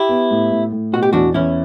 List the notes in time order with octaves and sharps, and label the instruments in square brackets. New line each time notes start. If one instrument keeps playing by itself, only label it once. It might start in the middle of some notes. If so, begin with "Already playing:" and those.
Already playing: [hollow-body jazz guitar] E4 G4
[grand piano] B3
A2
A2
A2
[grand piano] B2 [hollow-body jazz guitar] F#4
[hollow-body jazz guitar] G4
[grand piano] E2 [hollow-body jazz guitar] D4 F#4
[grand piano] E2 [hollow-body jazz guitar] C#4 E4